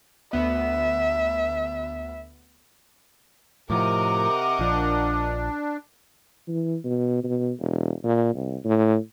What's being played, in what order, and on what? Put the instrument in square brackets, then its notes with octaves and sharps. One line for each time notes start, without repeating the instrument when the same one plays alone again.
[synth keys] D2 B3 [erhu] E5
[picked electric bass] A2 F3 [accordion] C3 [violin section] A#4 D#5 F#5 [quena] D6
[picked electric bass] A#1 F3 [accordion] D4
[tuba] E3
B2
B2
E1
A#2
C2
A2